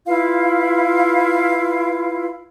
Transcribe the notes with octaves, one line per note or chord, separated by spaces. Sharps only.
E4 F4 B4 F5